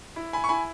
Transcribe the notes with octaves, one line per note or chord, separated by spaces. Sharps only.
E4
G#5 B5
C#6
E4 G#5 B5